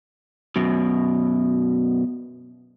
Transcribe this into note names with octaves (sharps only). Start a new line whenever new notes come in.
F#2 B2